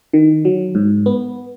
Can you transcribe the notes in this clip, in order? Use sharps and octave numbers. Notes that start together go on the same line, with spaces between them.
D#3
F#3
G#2
B3